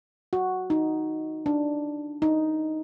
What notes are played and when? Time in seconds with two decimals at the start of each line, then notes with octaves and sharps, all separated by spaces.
0.33 F#4
0.70 D#4
1.46 D4
2.22 D#4